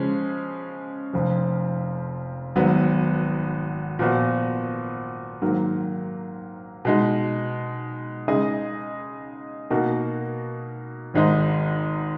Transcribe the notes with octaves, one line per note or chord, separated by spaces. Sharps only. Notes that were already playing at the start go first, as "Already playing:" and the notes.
Already playing: C#3 F3 G#3 C#4 G#4
F1 F2 F3
G#1 G#2 F#3 B3
A#2 F3 B3 F#4
G#2 D#3 F#3 A#3
B2 G#3 D#4
C#3 G#3 D#4 G#4 D#5
B2 A#3 D#4 F#4
G#1 G#2 D#3 G#3 D#4